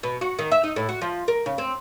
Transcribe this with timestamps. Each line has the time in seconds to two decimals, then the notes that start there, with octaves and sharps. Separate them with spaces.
0.03 B2
0.21 F#4
0.39 D#3
0.51 E5
0.64 D#4
0.76 A2
0.89 F#4
1.01 F3
1.28 A#4
1.46 C#3
1.58 C4